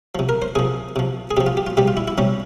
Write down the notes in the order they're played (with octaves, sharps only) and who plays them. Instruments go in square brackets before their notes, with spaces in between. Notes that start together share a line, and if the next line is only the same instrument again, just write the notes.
[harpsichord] C3 F3
A#4
C5
C3 F3 G#4
C3 F3
G#4
C3 F3 G4
F4
G4
F4
C3 G3 G4
F4
E4
E4
C3 G3 C#4